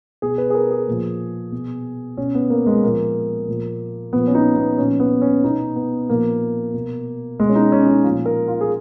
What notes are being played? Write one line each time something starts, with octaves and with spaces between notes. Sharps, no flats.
B2 G#4
B4
G#4
A#4
G#4
A#2 F3
B2
B2 C#4
B3
A#3
G#3
A#2 F3 A#3
A#2 F3
A#2 F3 B3
C#4
D#4
B3
A#2 F3 C#4
B3
C#4
B2 D#4
B3
A#2 F3 A#3
B2
B2 G#3
C#4
D#4
C#4
D#4
F3 F4
A#2
A#4
F4
G#4